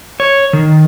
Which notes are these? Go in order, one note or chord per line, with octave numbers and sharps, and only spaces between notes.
C#5
D#3